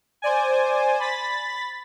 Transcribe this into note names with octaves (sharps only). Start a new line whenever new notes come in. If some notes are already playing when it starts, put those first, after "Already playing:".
C5 D5 G#5
B5 A6 B6